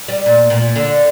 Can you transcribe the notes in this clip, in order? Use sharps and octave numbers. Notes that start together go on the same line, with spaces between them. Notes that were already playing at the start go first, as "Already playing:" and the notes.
G3
A#2
A#2
D3